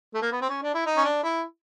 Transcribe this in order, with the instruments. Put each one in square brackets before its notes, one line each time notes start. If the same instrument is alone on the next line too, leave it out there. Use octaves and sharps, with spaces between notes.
[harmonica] A3
A#3
B3
C4
C#4
D4
E4
D#4
C#4
D4
E4